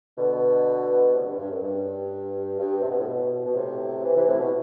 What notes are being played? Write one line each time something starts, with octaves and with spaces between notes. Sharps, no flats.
B2 D3
A2 C3
G2
G2
F#2
G2
G2
C3
B2
A2
B2
B2
A2 C3
C3 E3
C3 E3
A2 C3
B2